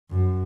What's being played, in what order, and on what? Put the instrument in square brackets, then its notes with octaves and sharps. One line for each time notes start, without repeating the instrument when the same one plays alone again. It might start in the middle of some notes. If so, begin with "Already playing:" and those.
[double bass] F#2